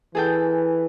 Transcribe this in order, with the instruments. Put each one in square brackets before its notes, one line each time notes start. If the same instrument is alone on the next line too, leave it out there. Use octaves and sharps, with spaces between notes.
[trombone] E3 [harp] G#4 A4 G5